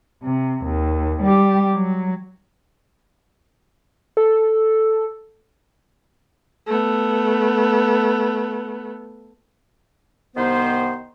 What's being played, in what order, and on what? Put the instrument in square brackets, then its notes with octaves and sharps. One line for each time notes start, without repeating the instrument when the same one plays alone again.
[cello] C3
D#2
G3 G4
F#3
[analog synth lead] A4
[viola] A3 B3
[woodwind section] C2 D#3 B3 C5